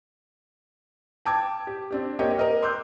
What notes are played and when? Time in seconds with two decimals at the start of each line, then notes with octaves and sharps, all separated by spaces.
1.25 G5 A5 D6 G#6
1.67 G4
1.91 C4 D4 G4
2.19 A#3 C4 G4 C#5 D#5 G5
2.37 A#4 D#5 F6
2.62 C6 D6 E6 F#6 G6